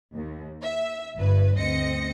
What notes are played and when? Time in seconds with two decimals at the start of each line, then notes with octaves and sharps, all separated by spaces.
0.15 D#2
0.62 E5
1.16 G1 G2 B4
1.57 D2 C4 D#5 A#6 C#7